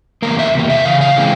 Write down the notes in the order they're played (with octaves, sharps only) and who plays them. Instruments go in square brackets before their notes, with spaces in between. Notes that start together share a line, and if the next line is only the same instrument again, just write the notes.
[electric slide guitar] E2 C3 G3 A#3 A#4
E5
E2 C3 A#3
E5
C#3 E3 F5
F5
C#3 E3 G#3 C4